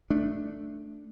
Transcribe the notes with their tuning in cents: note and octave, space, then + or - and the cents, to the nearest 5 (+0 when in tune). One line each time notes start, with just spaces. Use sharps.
A3 +0 D4 +0